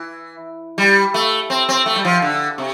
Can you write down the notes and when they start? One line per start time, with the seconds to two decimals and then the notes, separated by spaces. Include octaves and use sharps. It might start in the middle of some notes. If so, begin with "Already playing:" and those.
Already playing: E3
0.78 G3
1.14 A3
1.50 C4
1.69 C4
1.86 A3
1.96 G3
2.05 F3
2.22 D3
2.58 C3